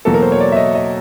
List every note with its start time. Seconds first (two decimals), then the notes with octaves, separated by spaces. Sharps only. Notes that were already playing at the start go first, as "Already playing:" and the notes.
0.05 E2 B2 F#3 A#3 A4
0.14 A#4
0.22 C5
0.32 C#5
0.41 D5
0.52 E5
0.57 D#5
0.75 D#5